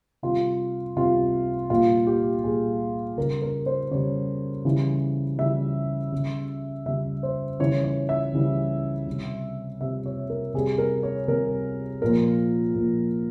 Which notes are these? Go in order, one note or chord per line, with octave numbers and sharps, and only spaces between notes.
C3 G3 F4
C3 G3 F4
A#2 G3 F4
G4
A#2 G3 G#4
C#3 G3 A#4
A#4
C5
C#3 G3 C#5
C#3 E3 G3
C#3 E3 G3 E5
C#3 G3
C#3 G3 E5
C5
C#3 E3 G3 C#5
C#5
E5
C#3 E3 G3
C3 G3
C3 G3 E5
C#5
A#4
C3 G3 G#4
A#4
C#5
C3 G3 A#4
A#2 F3 A#4
A#2 F3